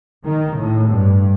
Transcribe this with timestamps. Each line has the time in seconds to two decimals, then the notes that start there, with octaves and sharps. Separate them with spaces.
0.24 D#3
0.57 A2
0.89 G2